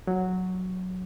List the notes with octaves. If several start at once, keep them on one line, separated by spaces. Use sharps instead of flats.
F#3